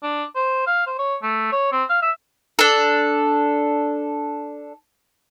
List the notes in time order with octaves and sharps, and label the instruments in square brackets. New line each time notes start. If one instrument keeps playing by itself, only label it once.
[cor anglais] D4
C5
F5
C5
C#5
A3
C#5
C4
F5
E5
[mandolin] D4 A4